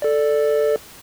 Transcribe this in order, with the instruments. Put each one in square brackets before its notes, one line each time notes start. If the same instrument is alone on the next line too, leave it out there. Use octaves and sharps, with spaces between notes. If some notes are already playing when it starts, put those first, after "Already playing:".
[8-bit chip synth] A4 D5